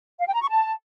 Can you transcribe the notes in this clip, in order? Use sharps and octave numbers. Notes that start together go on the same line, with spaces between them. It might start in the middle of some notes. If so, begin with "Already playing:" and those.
F5
G5
A#5
C#6
A5